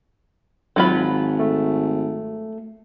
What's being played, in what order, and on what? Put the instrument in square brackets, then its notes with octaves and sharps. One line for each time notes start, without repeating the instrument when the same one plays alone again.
[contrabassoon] G#1 [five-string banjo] F#3 F4 B5
[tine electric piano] A3